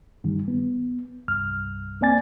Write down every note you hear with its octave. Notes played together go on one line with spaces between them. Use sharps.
G2 D#3 G3
B3
C2 G2 F6
A#3 C4 D5 G#5 A6